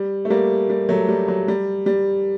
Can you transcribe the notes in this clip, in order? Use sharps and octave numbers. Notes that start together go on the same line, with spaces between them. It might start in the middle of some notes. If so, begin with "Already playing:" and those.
Already playing: G3
A3
G3 A#3
G3
F#3 A3
G3
F#3
G3
G3